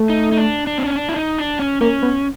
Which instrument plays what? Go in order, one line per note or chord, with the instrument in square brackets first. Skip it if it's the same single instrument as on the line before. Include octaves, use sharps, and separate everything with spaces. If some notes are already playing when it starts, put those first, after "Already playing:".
Already playing: [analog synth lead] A3
[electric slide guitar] D#4
D#4
D4
D4
C4
C#4
D4
E4
D#4
D4
C#4
[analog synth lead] A#3 [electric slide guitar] C#4
[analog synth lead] B3